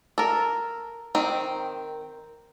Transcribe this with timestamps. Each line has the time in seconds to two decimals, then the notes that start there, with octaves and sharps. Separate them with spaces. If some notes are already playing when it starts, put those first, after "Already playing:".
0.18 A4 A#4
1.15 D#3 C4